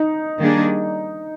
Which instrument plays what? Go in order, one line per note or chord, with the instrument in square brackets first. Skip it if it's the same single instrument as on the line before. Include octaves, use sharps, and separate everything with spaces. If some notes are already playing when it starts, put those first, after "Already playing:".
Already playing: [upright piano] D#4
[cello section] D#3 G3 A#3 D4 G#4